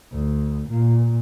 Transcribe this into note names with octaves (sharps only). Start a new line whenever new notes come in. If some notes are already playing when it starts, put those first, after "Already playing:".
D2
A#2